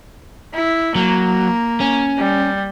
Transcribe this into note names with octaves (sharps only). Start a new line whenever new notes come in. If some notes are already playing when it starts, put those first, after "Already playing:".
E4
F#3 A#3
C#4
G3